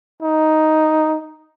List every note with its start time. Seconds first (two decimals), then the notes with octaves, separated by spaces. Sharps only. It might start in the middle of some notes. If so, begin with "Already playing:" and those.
0.23 D#4